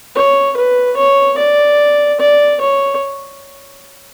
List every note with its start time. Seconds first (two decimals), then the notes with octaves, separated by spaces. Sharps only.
0.15 C#5
0.57 B4
0.97 C#5
1.38 D5
2.20 D5
2.61 C#5